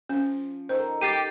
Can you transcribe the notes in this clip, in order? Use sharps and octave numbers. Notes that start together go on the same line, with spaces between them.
F3 C#4
D#3 A4 C5
G4 A6 C7 D#7